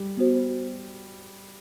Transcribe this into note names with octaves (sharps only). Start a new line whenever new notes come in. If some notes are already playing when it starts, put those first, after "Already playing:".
Already playing: G3
B3 F#4 C5